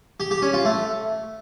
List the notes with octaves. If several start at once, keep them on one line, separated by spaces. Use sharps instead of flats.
G4
G4
C#4
F4
A3